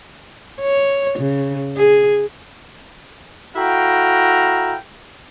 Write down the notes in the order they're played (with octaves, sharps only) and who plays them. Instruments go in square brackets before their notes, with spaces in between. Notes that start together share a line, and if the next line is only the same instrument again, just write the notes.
[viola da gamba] C#5
C#3
G#4
[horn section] E4 F#4 A4 F5 G5 A#5